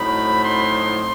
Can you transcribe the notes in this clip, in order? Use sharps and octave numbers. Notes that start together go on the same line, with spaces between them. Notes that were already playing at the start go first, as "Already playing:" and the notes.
Already playing: A2 F#3 C4 D#4 B5
C6